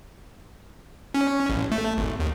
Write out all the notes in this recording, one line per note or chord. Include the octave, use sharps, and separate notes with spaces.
C#4
A1
A3
G#1
D#2